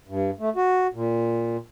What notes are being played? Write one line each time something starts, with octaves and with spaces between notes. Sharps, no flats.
G2
A3
F#4
A#2